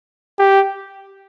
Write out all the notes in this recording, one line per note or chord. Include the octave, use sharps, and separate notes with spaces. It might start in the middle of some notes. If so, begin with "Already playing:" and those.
G4